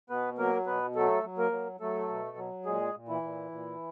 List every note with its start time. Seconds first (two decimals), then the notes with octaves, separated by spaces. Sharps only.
0.10 B2 B3 B4
0.38 F#3 A#3 A#4
0.67 B2 B3 B4
0.95 F#3 A3 A4
1.24 F#3
1.38 A#3 A#4
1.52 F#3
1.80 F#3 A3 A4
2.09 B2
2.37 F#3
2.65 A#2 G#3 G#4
2.94 A#2
3.08 E3 E4
3.22 A#2
3.51 A#2